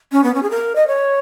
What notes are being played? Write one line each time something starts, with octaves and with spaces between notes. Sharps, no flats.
C#4
B3
C#4
G#4
A#4
D#5
C#5